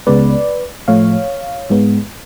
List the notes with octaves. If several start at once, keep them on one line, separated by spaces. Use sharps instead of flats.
C#2 C#3 G#3 B3 B4 D5
A2 F3 A3 C#5 F5
G#2 G#3 B3